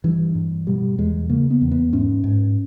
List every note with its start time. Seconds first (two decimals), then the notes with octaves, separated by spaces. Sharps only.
0.04 G2 E3
0.35 G2
0.67 B2 G3
0.98 E2 G#3
1.29 C#3 A#3
1.50 B3
1.61 E2
1.71 B3
1.93 G#2 C#4
2.24 G#2